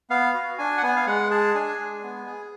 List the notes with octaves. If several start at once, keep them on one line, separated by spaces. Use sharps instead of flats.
B3 F5
F#4
D4 G#5
F#5
B3 G#5
F5
G#3 F#5
G#4 A5
D4 G#5
G#3
B3
G#4